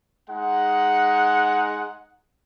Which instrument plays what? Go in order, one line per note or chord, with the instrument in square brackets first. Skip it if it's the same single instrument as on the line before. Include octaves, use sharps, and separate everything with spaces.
[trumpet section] G#3 D#4 F#5